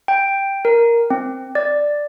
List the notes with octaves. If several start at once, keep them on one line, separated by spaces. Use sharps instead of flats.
G5
A#4
C4
D5